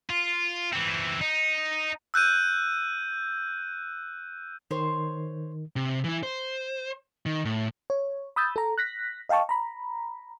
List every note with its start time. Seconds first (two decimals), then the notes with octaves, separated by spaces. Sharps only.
0.10 F4
0.73 E3 C4
1.21 D#4
2.14 E6 F#6 G6 D#7
4.71 D#3 C5 C#5 C6
5.76 C3
6.04 E3 E4
6.23 C5
7.26 D#3
7.45 A2
7.90 C#5
8.36 B5 D#6 E6 G6 A6
8.56 A4 A#5
8.78 F#6 A#6 B6
9.29 D#5 F5 G5 A5 C#6
9.49 A#5 B5